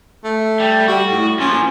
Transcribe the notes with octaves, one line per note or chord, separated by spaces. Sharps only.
A3
G3
G3 F#4
A2
A#2 F3 C#4